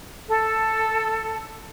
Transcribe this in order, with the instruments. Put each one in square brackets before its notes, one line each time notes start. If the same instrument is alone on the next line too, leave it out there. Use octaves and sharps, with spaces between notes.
[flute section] A4